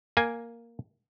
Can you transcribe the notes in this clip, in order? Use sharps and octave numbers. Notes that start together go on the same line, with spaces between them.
A#3 G#5